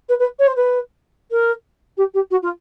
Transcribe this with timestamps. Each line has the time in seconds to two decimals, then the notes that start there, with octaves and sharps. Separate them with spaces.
0.09 B4
0.19 B4
0.39 C#5
0.47 C5
0.56 B4
1.31 A#4
1.97 G4
2.14 G4
2.30 F#4
2.42 F4